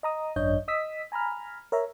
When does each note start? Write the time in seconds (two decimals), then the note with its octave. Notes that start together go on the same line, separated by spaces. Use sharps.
0.03 D#5 A#5 D#6
0.36 G#1 F#2 D4 C#5 D#5 G6
0.68 D#5 D#6 E6 B6
1.12 G#5 A#5 B5 F6
1.72 A#4 C#5 E5 A#5